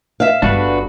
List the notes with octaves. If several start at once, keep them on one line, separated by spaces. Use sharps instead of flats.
E5 F5
G1 D4 F4 F#4 B4